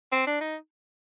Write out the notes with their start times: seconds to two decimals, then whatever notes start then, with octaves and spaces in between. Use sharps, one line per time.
0.12 C4
0.27 D4
0.41 D#4